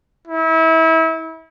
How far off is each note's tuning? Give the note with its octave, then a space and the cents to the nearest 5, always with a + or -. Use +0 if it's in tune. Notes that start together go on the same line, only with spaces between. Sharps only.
E4 -30